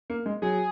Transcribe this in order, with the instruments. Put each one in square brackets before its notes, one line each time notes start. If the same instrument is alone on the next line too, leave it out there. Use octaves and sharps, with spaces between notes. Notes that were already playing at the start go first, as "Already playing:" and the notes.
[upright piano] A#3
G#3
[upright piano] F#3 [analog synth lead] G#4